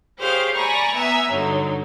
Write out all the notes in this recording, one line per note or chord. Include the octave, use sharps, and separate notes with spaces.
G4 G#4 C5 C#5 F5
D5 G#5 A#5 B5 C#6
B3 E5 G#5 A#5
G2 D3 F#3 D#4